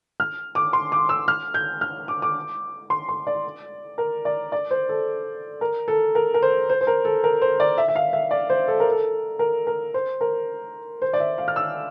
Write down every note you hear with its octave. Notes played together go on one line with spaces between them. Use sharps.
F6
D6
C6
D6
E6
F6
G6
F6
D6
D6
C6
C6
D5
A#4
D5
D5
C5
A4
A#4
A4
A#4
A#4
C5
C5
C5
A#4
A4
A#4
C5
D5
E5
E5
F5
E5
D5
C5
A4
A#4
A4
A#4
A#4
C5
A#4
C5
D5
E5
F5
F6
E6